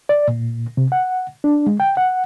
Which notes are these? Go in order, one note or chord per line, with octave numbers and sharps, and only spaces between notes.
D5
A#2
C3
F#5
D4
G#3
G5
F#5